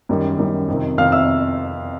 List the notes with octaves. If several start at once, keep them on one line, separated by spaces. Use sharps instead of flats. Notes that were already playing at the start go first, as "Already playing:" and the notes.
F#2 D#3 G3
F#2 D#3 G3
F2 C3 D#3
F2 C3 D#3 F5 F6
E5 E6